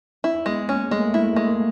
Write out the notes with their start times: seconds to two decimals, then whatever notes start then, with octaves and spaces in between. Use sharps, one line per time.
0.24 C4 E4
0.46 G#3 B3
0.68 A#3 C#4
0.91 G#3 A3
0.99 A#3
1.07 A3
1.14 A#3 E4
1.23 A3
1.32 A#3
1.36 G#3 A3
1.48 A#3
1.56 A3